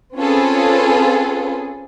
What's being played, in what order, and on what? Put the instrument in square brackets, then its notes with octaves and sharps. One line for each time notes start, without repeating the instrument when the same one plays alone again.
[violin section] C4 C#4 F4 G#4 A4 B4